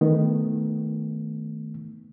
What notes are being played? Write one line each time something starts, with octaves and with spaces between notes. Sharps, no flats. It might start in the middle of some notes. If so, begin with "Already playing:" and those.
D#3 A3 B3